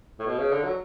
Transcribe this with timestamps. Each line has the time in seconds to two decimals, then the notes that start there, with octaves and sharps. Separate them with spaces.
0.19 A2
0.27 B2
0.39 C#3
0.52 D3
0.64 F#3